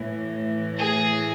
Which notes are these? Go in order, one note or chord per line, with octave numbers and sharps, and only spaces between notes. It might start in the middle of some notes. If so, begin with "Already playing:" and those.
Already playing: A2 E3
G#4